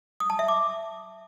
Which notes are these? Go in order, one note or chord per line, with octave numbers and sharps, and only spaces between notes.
D#6
A5
E5
D6